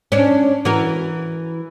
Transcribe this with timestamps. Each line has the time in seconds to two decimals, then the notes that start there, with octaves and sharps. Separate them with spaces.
0.12 C#4 D4
0.65 E3 F#4 A#4